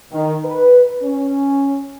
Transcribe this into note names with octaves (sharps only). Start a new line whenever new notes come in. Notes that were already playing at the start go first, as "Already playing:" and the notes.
D#3
B4
C#4